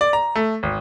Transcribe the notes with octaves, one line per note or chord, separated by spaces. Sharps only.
D5
A#5
A3
G#1